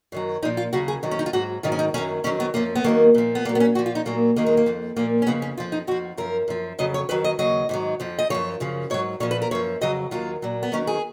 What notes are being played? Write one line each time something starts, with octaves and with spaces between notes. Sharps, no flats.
F#2 D#3 F#3
A#2 F3 D#4
F4
D#2 C#3 F#3 F#4
G#4
F2 D#3 F#3
C#4
D#4
F4
G#2 F#3 F#4
G#2 D#3 F#3 F4
C#4
D#4
F#2 D#3 F#3 C#4
F2 D#3 F#3 C#4
B3
F#2 F3 A#3
B3
D#2 D#3 F#3 A#3
A#2 F3
B3
A#2 F#3 A#3
B3
C#4
A#2 F3 F#4
F4
D#4
A#2 F#3 A#3
D#2 D#3 F#3 A#3
G#3
A#3
F2 F3
A#2 F3 A#3
C#4
F2 C#3 F3 B3
C#4
F2 F3 F4
D#4
F2 F3 F#4
F#2 F3 A#4
F#2 F3
F2 C#3 F#3 D#5
C#5
F2 D#3 F#3 B4
D#5
D#2 C#3 F#3 D#5
G#2 D#3 F#3
F2 F3
D#5
F#2 C#3 F3 C#5
F#2 C#3 F3
G#2 F#3 C#5
A#2 F3 C#5
B4
A#4
F#2 F3 C#5
F2 C#3 F#3 D#5
D#2 D#3 F#3 F4
A#2 F#3
B3
D#2 D#3 F#3 C#4
G#4